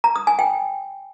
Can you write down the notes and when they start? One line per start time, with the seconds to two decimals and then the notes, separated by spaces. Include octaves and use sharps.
0.04 A#5
0.16 D#6
0.27 G#5
0.39 G5